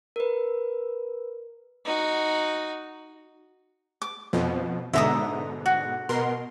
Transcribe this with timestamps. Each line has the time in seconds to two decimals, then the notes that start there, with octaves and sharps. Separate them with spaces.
0.16 A#4 B4
1.85 D#4 F#4
4.02 D6
4.33 F2 B2 F3
4.93 G#2 B2 D3 E5 A#5 D#6
5.66 F#4
6.09 B2 A#4 C6